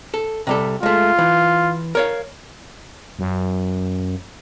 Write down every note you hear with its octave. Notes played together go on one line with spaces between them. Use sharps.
A4
C3 G3 A4
G#3 A3 F4
E3
A#4 C#5 F5
F#2